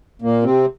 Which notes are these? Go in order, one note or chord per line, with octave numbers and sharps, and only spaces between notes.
A#2 A#3
C3 C4